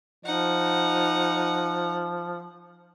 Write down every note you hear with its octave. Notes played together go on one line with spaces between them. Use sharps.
F3 D#4 F#5